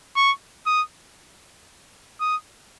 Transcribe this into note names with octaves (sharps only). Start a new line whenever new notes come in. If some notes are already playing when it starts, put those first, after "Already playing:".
C#6
D#6
D#6